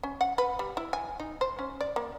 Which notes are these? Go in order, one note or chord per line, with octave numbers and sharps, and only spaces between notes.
C#4
F#5
B4
G3
E4
G#5
D#4
C5
C#4
D5
A#3